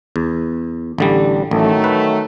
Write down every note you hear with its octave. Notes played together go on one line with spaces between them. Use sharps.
E2
A1 D3 G3
A1 D#3 F#3 A3
B4